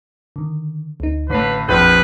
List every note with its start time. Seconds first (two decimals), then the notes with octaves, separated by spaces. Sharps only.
0.36 D3 D#3
1.00 D2 D#4
1.30 A1 A2 D3 B4 B6 C7
1.68 A#1 F2 B4 G6